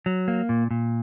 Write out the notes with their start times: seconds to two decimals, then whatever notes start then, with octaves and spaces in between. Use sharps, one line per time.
0.06 F#3
0.28 A#3
0.49 A#2
0.71 A#2